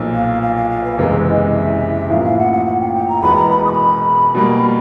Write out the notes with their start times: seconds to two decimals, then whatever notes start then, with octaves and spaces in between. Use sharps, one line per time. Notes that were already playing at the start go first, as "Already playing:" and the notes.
Already playing: B1 A#2 F3
0.14 F5
0.42 F5
0.56 F5
0.70 F5
0.84 B4
0.98 F#1 E2 C3 E3 G#3 A#4
1.26 D#5
1.55 E5
2.10 A1 A2 F3 A#3 F5
2.25 F5
2.38 F#5
2.53 F#5
2.66 F#5
2.80 G5
2.95 G5
3.08 A#5
3.22 E1 E2 B2 G#3 B3 B5
3.36 A#5
3.50 B5
3.65 D#6
3.69 B5
4.35 B2 G3 A#3